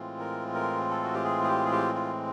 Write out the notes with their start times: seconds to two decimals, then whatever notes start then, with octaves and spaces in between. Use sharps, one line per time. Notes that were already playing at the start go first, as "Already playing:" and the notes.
Already playing: A2 E3 G#3 C4 F4
0.19 A#4
0.54 A#4
0.90 A4
1.04 F#4
1.14 G4
1.24 G#4
1.44 G#4
1.48 G4
1.65 G#4
1.72 G4
1.95 F4